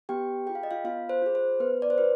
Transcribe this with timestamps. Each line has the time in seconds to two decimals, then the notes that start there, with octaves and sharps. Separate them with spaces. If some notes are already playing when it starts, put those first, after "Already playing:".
0.09 B3 G4 G5
0.46 F4 G#4 G5
0.55 F5
0.63 D#5
0.71 F4 F5
0.84 B3 F4 F5
1.09 C5
1.22 F4 G#4
1.35 C5
1.60 B3 B4
1.82 D5
1.90 C5
1.98 F4 B4